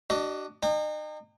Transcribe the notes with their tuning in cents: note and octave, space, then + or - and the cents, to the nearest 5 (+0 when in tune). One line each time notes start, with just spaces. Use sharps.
D4 +15 F#4 +45 D#5 -5
D#4 -35 G5 +45